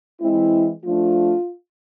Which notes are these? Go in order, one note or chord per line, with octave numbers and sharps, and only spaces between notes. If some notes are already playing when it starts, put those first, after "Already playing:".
E3 G#3 C4 E4
F3 A3 D4 F4